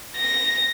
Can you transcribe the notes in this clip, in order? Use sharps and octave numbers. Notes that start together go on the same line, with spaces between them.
A#6